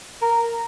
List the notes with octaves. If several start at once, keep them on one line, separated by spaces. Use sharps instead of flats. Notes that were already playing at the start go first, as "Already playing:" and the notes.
A#4